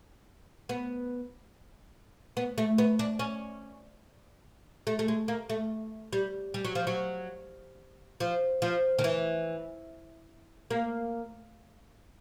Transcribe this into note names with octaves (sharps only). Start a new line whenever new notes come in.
B3
B3
A3
B3
D4
C#4
A3
A3
G#3
A#3
A3
G3
G3
F#3
F3
F#3
F3
F3
D#3
E3
A#3